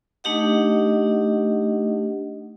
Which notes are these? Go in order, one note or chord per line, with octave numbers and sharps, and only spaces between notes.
A3 D4 D#4 G4 D#5 F#5